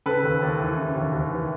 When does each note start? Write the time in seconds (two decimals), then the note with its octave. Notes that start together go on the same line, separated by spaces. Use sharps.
0.06 C#3 A4 B4
0.23 D#2
0.42 D#2
0.59 E3
0.77 C#3
0.96 D#2
1.13 D#2
1.31 E3